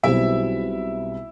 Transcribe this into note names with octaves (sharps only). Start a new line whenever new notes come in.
B1 B2 G3 C4 E4 E5